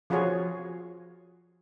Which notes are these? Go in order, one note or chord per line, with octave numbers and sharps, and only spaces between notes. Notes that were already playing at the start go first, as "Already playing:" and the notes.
F3 F4 F#4 G#4 C#5